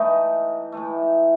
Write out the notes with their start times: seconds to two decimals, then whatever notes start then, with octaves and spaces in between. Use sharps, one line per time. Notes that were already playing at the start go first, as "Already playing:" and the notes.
Already playing: A2 E3 A3 D#4
0.72 A2 E3 A3